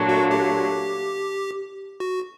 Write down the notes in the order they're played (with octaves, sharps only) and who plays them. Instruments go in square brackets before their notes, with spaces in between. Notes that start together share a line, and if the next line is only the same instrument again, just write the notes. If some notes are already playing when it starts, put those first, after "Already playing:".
Already playing: [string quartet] A#2 F#3 A3 D4
[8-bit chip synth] F#4
G4
F#4